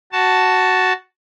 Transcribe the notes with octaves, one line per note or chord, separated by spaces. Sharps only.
F#4 A5